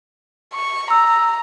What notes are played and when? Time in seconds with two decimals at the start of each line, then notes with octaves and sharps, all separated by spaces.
0.53 C#6
0.90 A#5 E6